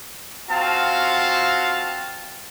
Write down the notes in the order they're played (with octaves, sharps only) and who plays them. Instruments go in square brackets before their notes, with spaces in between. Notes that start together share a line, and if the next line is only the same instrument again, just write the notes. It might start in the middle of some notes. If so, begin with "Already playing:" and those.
[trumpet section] C4 F4 F#4 F5 A5